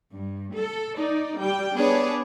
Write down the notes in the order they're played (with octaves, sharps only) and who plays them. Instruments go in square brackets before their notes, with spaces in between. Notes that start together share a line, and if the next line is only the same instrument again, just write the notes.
[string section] G2
A4
D#4 D5
G3 G5
B3 D4 G#4 B4 C#5 D5